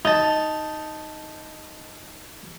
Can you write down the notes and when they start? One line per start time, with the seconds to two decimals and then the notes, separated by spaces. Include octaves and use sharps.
0.05 D#4 A5